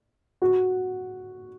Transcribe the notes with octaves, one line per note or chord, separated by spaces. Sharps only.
F#4